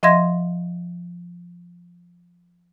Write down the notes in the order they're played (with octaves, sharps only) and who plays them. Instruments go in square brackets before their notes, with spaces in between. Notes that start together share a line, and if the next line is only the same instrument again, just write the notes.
[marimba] F3 D#5 E5 C6 G#6 A#6